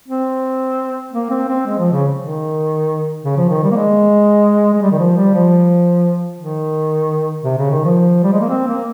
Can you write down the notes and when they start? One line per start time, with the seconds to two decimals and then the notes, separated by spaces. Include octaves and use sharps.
0.08 C4
1.12 A#3
1.30 C4
1.48 C4
1.66 G#3
1.78 F3
1.92 C#3
2.18 D#3
3.24 C#3
3.37 F3
3.49 D#3
3.63 G3
3.71 A#3
3.76 G#3
4.73 G#3
4.82 G3
4.91 D#3
4.98 F3
5.17 G3
5.34 F3
6.39 D#3
7.44 C3
7.58 C#3
7.71 D#3
7.85 F3
8.23 G3
8.32 G#3
8.40 A#3
8.49 C4
8.67 A#3